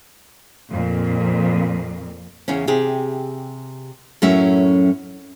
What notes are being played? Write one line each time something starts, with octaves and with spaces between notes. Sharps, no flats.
F2 A#2
E2 C#3 C#4
C3 G4 G#4
F#2 A2 F#3 C#4 E4 E5